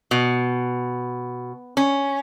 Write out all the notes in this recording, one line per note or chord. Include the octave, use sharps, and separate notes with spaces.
B2
C#4